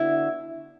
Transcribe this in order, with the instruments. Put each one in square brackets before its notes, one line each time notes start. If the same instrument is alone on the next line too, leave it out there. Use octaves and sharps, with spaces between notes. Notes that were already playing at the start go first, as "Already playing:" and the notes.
Already playing: [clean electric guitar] D3 B3 D4 F#4 [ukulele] E4